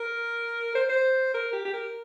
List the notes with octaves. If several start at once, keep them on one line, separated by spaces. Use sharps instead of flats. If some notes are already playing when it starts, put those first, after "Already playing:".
Already playing: A#4
C5
C5
A#4
G4
G4
A#4